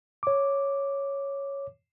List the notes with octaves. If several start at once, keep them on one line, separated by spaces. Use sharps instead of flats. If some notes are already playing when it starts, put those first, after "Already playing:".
C#5 D6